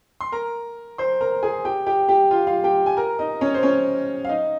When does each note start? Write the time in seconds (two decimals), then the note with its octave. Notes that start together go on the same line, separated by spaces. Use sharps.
0.21 C6
0.32 A#4 A#5
0.98 C5 C6
1.21 A#4 A#5
1.43 G#4 G#5
1.65 G4 G5
1.87 G4 G5
2.09 G4 G5
2.31 F4 F5
2.47 F4 F5
2.64 G4 G5
2.86 G#5
2.97 A#4 A#5
3.19 D#4 D#5
3.41 C#4 C#5
3.54 C5
3.63 C#4 C#5
4.25 F5
4.29 D#4 D#5